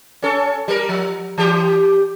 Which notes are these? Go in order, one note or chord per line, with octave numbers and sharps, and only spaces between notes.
C#4 A4
G3 A#4
F3
E3 G4